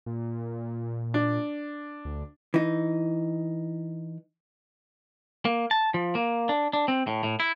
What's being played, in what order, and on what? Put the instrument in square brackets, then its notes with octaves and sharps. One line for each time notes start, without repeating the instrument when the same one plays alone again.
[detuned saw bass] A#2
[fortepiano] D4
[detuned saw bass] D2
[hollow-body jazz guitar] E3 D#4
[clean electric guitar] A#3
A5
F3
A#3
D4
D4
C4
A2
A2
E4